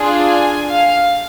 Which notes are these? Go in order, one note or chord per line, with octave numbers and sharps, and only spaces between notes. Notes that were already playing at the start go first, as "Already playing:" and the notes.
Already playing: D4 F4 G#4
G#5
F5